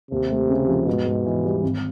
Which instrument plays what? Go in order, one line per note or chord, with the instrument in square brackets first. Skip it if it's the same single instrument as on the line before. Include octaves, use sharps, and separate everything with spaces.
[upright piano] D#2 [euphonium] C3
[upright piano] A3
C#3
F3
[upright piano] G#2 [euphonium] B2
[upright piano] G#2
E3
G3
G#1